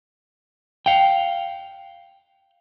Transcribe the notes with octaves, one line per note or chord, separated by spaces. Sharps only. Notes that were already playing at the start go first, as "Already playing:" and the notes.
F5 G5